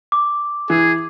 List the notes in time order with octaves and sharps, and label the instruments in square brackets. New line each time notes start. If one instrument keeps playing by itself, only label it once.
[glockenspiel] D6
[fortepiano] E3 [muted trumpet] G#4